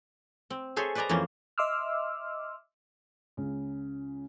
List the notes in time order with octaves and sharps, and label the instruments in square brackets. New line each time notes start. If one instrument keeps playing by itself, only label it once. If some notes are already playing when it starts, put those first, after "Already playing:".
[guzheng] C4
G#4 A4 C5 C#5 E5 G#5
B4 C5 D5 D#5 G#5 A#5
F2 E3 A#3 C#4 C5
[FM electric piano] D#5 E5 C6 D6 E6 F6
[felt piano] C#2 C#3